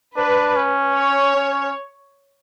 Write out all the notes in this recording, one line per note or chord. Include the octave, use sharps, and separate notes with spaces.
D4 B4
C#4
C#5
C#4